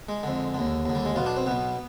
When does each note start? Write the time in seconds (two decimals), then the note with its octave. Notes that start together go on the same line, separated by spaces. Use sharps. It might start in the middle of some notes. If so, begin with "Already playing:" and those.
0.09 G#3
0.23 F2 D3
0.54 D#2 D3
0.85 D#2 D3
0.95 G3
1.05 G#3
1.16 B1 B2 F4
1.26 D4
1.36 C4
1.46 B1 B2 B3